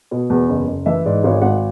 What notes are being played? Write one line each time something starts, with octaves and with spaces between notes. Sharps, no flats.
B2
E2
F#1
F#1
E3 E5
G#2 D5
G#1 C#5
G#1 F#5